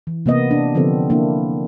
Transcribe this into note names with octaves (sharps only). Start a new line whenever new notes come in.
E3
C3 A#3 B3 D#5
D4
D3 F3 B3 C4 A4
A#3 D4 E4